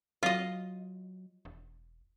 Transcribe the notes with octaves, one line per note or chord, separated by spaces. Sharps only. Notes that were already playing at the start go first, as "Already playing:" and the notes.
F#3 F4 D#5
E1